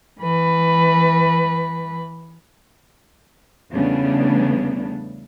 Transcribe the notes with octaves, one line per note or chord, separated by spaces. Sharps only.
E3 B4
E2 C#3 G3 A3 B3 D4